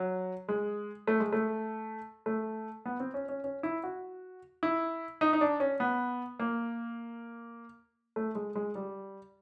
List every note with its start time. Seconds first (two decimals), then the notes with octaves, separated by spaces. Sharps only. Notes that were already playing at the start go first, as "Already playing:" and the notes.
Already playing: F#3
0.49 G#3
1.08 A3
1.20 G#3
1.33 A3
2.26 A3
2.86 B3
3.00 C4
3.14 C#4
3.29 C#4
3.44 C#4
3.63 E4
3.83 F#4
4.63 E4
5.21 D#4
5.33 D#4
5.41 D4
5.60 C#4
5.80 B3
6.39 A#3
8.16 A3
8.35 G#3
8.55 G#3
8.75 G3